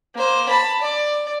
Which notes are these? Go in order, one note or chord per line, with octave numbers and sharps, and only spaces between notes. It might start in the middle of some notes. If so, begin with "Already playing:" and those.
A#3 C5
A5 B5
D5